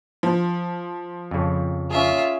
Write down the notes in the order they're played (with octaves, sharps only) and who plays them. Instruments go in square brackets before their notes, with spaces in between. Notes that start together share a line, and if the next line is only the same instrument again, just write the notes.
[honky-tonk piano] F3
[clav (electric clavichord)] F2 C#3
[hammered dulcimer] C#4 G#4 [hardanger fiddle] F4 E5